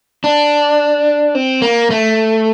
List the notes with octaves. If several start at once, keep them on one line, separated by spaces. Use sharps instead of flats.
D4
C4
A#3
A3